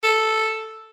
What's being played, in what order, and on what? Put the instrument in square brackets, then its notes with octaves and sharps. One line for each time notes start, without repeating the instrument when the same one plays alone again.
[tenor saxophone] A4